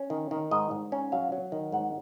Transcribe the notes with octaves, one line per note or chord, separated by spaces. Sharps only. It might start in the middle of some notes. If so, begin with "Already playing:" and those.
Already playing: C#4
D#3
D#3
G#2 D#5
G#2
C#4
F#3 F5
F#3
D#3
G#2 F#5